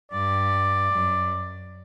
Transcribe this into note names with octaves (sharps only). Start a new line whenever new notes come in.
G2 D5
F#2